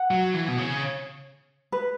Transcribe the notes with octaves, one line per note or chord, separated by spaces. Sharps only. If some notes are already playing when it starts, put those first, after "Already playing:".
Already playing: F#5
F#3
E3
B2
C#3
B4